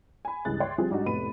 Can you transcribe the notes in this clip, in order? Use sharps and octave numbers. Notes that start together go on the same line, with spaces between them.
G#5 B5
C#2 G2 E3 G#4 F#6 A6
C#5 D5 E5 G5 C6
F3 G3 C4 G#4
G#2 G3 G#3 D4 D#4 F#4
F1 A2 B3 B5 D#7